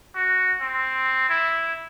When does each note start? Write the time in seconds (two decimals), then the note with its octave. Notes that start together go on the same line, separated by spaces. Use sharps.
0.15 F#4
0.61 C4
1.30 E4